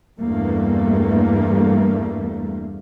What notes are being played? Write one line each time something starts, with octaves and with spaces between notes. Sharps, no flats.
E2 G2 G3 A3 A#3